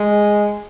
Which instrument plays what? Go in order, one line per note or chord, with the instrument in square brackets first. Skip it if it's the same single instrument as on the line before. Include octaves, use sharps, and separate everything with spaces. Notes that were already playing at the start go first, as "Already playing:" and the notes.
Already playing: [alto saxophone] G#3